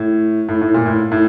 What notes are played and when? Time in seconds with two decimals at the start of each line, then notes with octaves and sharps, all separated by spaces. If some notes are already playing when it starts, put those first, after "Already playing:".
Already playing: A2
0.49 A2
0.62 A2
0.74 A#2
0.86 A2
1.12 A2